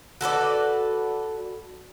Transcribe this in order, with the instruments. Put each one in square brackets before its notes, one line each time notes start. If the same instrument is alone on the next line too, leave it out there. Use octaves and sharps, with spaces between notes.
[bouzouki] F#4 A4 B4 D5